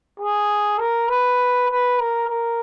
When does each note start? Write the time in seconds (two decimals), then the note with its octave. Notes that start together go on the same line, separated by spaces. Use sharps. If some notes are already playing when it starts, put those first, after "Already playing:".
0.20 G#4
0.79 A#4
1.08 B4
1.68 B4
1.99 A#4
2.28 A#4